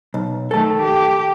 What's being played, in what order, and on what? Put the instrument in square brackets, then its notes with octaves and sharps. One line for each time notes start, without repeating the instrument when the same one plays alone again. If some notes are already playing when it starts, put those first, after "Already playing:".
[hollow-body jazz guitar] B1
[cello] D#3 A3 [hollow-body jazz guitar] A4 A5
[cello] G4